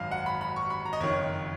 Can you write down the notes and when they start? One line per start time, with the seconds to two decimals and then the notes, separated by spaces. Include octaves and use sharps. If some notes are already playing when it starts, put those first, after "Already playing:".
Already playing: G#1 F#2 D#3 F5
0.11 F#5
0.26 B5
0.41 B5
0.56 C#6
0.70 B5
0.86 A#5
0.93 D#5
1.00 F#1 F2 D#3 C#5